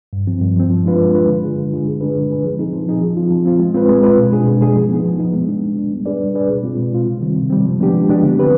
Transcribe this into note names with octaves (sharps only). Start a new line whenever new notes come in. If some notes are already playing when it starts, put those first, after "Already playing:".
G2
F3 C4
G2
F3 C4
F3
G#3 D4 F4 B4
F3
G#3 D4 F4 B4
D3
G#3 D4 F4 G#4
D3
G#3 D4 F4 G#4
D3
G#3 D4 G#4 B4
D3
G#3 D4 G#4 B4
F3
C4 D#4 G#4
F3
C4 D#4 G#4
F3
C4 F4
F3
C4 F4
G#3
C4 F4 B4
G#3
C4 F4 B4
B2
G#3 D4 G#4
B2
G#3 D4 G#4
F3
B3 D#4
F3
B3 D#4
G#3
B3 D4
G#3
B3 D4
G3
D4 G#4 B4 D5
G3
D4 G#4 B4 D5
B2
G#3 C4 F4
B2
G#3 C4 F4
C3
D#3 G3 C4
C3
D#3 G3 C4
F3
G#3 B3 D4 G4
F3
G#3 B3 D4 G4
D3
F3 C4 G4 B4